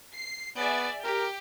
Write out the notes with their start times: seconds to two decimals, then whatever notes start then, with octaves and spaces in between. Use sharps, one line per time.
0.14 C7
0.57 B3 G#4 D5 E5
1.04 G4 A#4